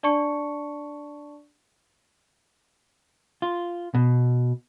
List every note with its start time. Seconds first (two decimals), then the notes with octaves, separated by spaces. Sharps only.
0.03 D4 D5 A5 C#6 C#7
3.42 F4
3.94 B2